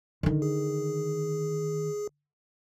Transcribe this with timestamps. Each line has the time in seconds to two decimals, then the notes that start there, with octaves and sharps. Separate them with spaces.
0.23 D3 D#3
0.42 G#4